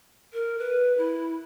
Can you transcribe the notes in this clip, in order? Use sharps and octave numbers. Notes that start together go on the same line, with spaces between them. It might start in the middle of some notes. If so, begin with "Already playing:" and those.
A#4
B4
E4